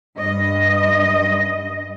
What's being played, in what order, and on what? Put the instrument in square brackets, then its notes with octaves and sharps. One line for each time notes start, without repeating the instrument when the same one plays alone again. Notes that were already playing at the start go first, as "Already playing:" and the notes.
[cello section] G2 D#5